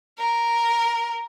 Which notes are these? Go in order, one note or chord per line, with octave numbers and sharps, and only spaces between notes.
A#4